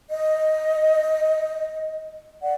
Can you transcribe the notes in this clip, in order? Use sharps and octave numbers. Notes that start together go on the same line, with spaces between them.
D#5
D5 F#5